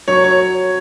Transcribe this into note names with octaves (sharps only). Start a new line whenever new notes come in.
F#3 C#5
C#5